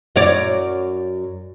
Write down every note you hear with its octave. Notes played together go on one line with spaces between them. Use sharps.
F#2 C#5 D5